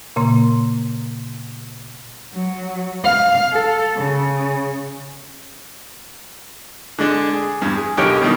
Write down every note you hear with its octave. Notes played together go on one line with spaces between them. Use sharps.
A#2 C#3 A#3 C6
F#3
F5
A4
C#3
D3 G#3 D4
G#4
E2 G2
G#4
B1 D3 G4 A#4 C#5 G5
B2 D#3 G3 D#4